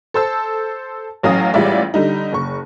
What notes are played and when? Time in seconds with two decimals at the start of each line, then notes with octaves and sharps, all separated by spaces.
0.14 A4 C5 A5 E6
1.23 A1 F#3 C#4 F5 D#6
1.54 A1 G3 G#3 F4 D5 E5
1.94 D3 G3 D#4
2.33 F#1 C#6